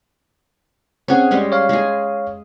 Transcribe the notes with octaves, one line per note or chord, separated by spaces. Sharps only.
C4 C#4 G#4 F#5
G3 G#3 C#4
C#5 F5
G#3 G#4